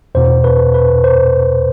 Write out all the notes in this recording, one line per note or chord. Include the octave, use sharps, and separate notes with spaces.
E2 B2 C5
B4
B4
C5